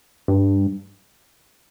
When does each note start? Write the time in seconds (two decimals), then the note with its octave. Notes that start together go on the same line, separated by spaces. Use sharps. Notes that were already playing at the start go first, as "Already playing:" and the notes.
0.28 G2